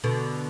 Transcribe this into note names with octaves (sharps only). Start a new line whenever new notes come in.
B2 D3